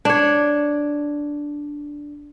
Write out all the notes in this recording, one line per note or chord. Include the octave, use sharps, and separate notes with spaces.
D4 C#5